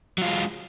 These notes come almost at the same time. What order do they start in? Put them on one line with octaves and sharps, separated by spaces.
F#3 F4 G#3